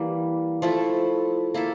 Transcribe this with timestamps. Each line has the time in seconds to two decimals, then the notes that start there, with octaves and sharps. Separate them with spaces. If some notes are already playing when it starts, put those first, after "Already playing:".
Already playing: E3 G3 A#3
0.62 F3 A3 E4 A4
1.54 A#3 E4 A4